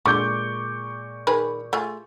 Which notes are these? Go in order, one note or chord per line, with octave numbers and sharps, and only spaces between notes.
A#2 D3 G#3 C#6 D6 G6
D#3 G#4 B4
A3 F4 G#4